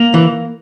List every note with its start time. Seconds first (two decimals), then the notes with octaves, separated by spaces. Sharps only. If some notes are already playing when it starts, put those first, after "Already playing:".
Already playing: A#3
0.14 E3